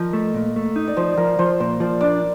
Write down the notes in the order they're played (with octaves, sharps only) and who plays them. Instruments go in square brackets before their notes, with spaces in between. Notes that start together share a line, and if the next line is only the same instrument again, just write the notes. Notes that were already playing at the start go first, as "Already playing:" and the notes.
Already playing: [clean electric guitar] F3 [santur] A#4 D#5
[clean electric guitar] A3
A#2
A3
D#4
[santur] D5
[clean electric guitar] F3 [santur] C5
[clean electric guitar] F3 [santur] A#4
[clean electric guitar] F3 [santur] C5
[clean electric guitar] A#2 [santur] C5
[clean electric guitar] F3 [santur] D5
[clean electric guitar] D4 [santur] D5